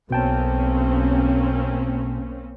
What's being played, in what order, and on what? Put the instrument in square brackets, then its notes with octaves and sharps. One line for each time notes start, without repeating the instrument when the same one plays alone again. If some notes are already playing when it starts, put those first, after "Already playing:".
[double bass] B1 [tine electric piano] B2 G5 A5 [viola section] A#3 C4 C#4